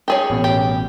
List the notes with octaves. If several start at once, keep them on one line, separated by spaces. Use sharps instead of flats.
G4 G#4 C#5
A1 B2
G4